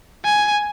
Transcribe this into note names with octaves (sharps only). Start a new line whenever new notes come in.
G#5